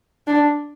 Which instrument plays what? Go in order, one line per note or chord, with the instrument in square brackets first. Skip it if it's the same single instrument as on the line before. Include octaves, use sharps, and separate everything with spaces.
[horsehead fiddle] D4